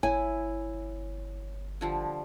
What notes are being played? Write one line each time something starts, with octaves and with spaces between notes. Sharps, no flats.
G1 E4 C#5 G#5
D3 F3 G3